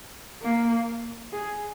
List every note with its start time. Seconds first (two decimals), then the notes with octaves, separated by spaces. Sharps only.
0.42 A#3
1.33 G#4